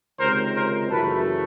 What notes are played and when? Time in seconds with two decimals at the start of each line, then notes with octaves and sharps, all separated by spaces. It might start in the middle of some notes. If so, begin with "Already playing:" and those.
0.20 C#2 C3 D#3 A#4 C5
0.56 A#4 C5
0.91 F#2 C#3 E3 A3 A4 B4